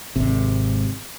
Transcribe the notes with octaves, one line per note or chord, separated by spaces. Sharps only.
G#1 C3